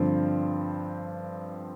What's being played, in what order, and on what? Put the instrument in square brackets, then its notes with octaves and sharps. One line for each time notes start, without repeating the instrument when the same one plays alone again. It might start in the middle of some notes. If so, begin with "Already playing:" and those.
Already playing: [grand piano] G2 D3 F3 C4